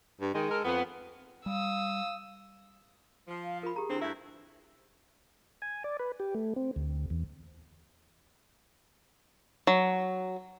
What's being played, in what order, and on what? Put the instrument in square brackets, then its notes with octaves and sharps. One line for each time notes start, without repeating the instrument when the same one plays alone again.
[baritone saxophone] G2
[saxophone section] D#3 [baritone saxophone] G#3
[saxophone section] A4 A#4
[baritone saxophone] F2 [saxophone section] B3
[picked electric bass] G3 [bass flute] F5 [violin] D#6 E6
[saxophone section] F3
[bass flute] F5
[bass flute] F4 [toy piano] A#4 B5
[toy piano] G4 A#5 [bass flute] G#4
[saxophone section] D3 C4 [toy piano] D4 E4
[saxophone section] G2 A3 E4 [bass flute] D4 [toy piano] E5
[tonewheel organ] G#5
D5
B4
G4
A3
C4
D2
E2
[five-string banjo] F#3